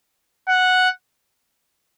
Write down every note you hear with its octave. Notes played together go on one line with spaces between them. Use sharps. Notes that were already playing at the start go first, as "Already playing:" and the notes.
F#5